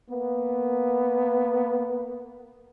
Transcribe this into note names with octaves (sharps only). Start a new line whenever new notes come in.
A#3 B3